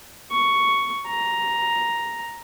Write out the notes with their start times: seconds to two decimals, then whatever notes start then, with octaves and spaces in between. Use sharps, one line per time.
0.31 C#6
1.07 A#5